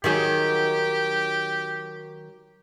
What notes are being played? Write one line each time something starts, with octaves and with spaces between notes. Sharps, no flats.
D#3 F#3 G4 G#4